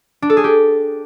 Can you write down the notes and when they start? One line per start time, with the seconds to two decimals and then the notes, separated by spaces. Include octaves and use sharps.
0.22 D4
0.30 A4
0.37 G#4
0.44 G4